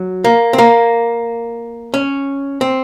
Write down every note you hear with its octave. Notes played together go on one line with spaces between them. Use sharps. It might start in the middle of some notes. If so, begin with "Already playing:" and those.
Already playing: F#3
A#3
C4
A#3
C#4
C4